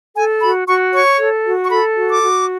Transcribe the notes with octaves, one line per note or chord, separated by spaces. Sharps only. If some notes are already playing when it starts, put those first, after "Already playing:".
A4 G#5
F#4 B5
F#4 C#6
C#5 C#6
A4
F#4
C#6
A4 B5
F#4
D6
F#4